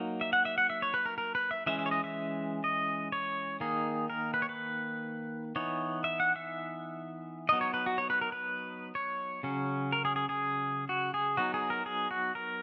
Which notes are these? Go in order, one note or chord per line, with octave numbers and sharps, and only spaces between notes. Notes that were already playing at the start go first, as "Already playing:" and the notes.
Already playing: F#3 A#3 D#4
E5
F#5
E5
F#5
E5
C#5
B4
A#4
A#4
B4
E5
E3 G#3 C#4 E5
E5
C#5
D#5
E5
D#5
C#5
D#3 A#3 D#4 G#4
A#4
B4
C#5
B4
E3 B3 D#4 C#5
E5
F#5
E5
F#3 B3 D#4 D#5
C#5
B4
F#4
C#5
B4
A#4
B4
C#5
C#3 F#3 C#4
A#4
G#4
G#4
G#4
F#4
G#4
F#3 B3 D#4 F#4
G#4
A#4
G#4
F#4
A#4